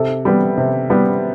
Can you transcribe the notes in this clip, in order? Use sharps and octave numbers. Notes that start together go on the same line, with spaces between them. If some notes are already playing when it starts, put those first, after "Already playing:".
Already playing: C3 A4
G3 B3
C3
G3 B3